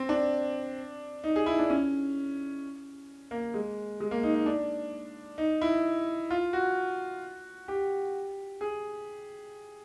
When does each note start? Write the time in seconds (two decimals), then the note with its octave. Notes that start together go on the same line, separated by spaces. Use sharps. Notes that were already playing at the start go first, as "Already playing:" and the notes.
Already playing: C4
0.09 D4
1.24 D#4
1.36 G#4
1.46 E4
1.59 D4
1.70 C#4
3.31 A#3
3.54 G#3
4.00 G#3
4.11 A#3
4.23 D#4
4.35 D#4
4.46 D4
5.38 D#4
5.61 E4
6.30 F4
6.53 F#4
7.68 G4
8.61 G#4